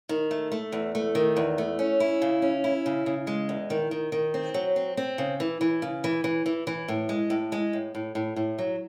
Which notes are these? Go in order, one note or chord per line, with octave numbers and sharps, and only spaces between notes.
D#3
A3
A3
E2
A3
D#3
E2
A3
C#4
E4
C#3
C#4
E4
C#3
C#3
G#3
E2
D#3
D#3
D#3
C4
F#3
C4
C4
C#3
E3
E3
C#3
E3
E3
E3
E3
A2
G#3
A2
G#3
A2
A2
A2
A2
F#3